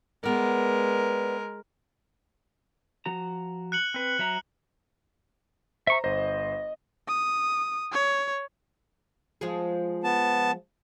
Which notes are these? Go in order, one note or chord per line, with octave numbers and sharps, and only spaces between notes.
G#3 B3 A#4 D5
F3 F#4 A#5
F#6 C#7 F#7
C4 B4
F#3 E5 A#5
C5 E5 A#5 C#6
G1 C5 D#5
D#6
C#5
F3 G#3 G#4
B3 A5